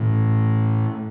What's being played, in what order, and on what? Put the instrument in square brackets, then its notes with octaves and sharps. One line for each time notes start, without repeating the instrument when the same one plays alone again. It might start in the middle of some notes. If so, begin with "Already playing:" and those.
Already playing: [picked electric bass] A2 E3 A3